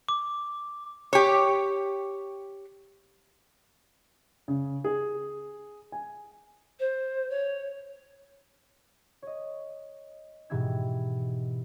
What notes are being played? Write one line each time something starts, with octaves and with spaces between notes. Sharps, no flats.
D6
G4 C#5
C#3
G#4
G#5
C5
C#5
C#5 D#5
G#2 B2 E3 G4 E6 G#6